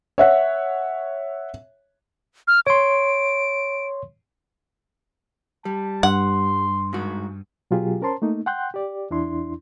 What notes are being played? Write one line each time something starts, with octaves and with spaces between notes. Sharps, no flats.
C#5 E5 F#5
F6
C#5 C6 D7
G3 A5
G2 F#5 C6
G#2 F#4
B2 F#3 F4 G4 G#4
C#4 A#4 C5 A5 C6
A3 A#3 D#4
F#5 G5 C6 F#6 G6
G4 D5
E2 D4 E4 C6